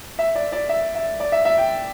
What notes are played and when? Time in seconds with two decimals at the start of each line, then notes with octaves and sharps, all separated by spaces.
0.19 E5
0.35 D5
0.52 D5
0.69 E5
0.95 E5
1.20 D5
1.32 E5
1.45 E5
1.58 G5